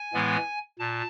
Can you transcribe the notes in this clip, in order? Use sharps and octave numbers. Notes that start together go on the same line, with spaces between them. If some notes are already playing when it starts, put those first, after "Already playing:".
Already playing: G#5
A2 E3 G#3 B3
A#2 A5